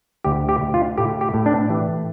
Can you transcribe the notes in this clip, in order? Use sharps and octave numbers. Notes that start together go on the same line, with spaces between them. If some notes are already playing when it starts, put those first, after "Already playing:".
D2 G4
G4
D2
F4
A2 G4
G4
A2
D4
E3 G4